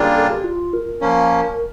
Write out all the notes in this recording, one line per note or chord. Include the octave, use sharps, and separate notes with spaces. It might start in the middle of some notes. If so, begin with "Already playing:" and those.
Already playing: C#3 G3 A#3 D4 F4
A4
G4
F4
A#4
F3 A#3 C#4